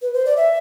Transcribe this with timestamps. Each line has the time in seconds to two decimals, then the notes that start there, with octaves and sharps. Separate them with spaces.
0.02 B4
0.13 C5
0.25 D5
0.37 E5